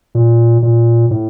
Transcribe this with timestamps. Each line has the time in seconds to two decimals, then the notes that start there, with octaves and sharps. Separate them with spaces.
0.15 A#2
0.63 A#2
1.11 A2